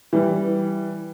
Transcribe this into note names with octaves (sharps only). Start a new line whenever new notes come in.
E3 G3